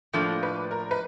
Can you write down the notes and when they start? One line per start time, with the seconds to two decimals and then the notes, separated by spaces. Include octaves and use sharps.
0.13 A2 F3 A#3 D4 A4
0.43 B4
0.71 A#4
0.91 B4